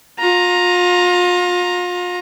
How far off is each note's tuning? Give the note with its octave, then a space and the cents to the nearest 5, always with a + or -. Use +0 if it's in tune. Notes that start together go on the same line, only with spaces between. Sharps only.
F4 +35 A#5 +0